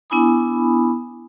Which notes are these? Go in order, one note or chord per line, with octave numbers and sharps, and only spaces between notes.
B3 D4 E4 G#5 B5 D#6